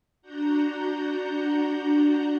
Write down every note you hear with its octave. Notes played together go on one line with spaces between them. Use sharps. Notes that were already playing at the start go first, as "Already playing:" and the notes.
D4 F#4 F#5 A#5 G6